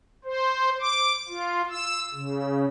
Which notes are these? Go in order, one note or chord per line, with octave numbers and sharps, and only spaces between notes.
C5
D6
F4
E6
C#3